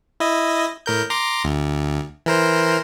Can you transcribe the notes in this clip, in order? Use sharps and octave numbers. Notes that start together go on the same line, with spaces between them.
E4 D#5
A2 A#4 G6
A#5 C6 D6
D2
E3 A#4 C5